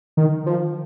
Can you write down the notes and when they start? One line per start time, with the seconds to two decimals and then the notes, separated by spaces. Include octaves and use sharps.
0.17 D#3
0.46 F3